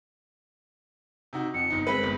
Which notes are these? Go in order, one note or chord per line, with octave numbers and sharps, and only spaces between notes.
C3 D#4 F#4
F2 C#7
G1 D#4
G#3 C4 B4 B5
G1